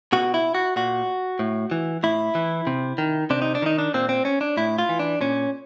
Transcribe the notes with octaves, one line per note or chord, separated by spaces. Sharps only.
B2 F#4
E4
F#4
A#2 F#4
A2
E3
A2 E4
E3
C3
D#3
C3 D4
D#4
D4
D#3 D#4
D4
A#2 C4
C4
C#4
D4
A2 E4
F4
E3
D4
A#2 C#4